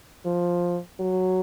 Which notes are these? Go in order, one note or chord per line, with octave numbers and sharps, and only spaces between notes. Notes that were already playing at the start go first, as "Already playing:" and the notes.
F3
F#3